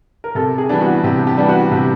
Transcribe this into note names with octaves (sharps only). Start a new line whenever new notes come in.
A#4
C3 A4
G#4
E3 G3 B3 D4
F#4
C3 G4
G4
E3 G3 B3 D4
F#4
C3 G4